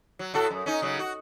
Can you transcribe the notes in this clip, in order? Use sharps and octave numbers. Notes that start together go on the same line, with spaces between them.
F#3
A2 F#4 A4
F#2
C#4 D#4
C#3 F#3
F#4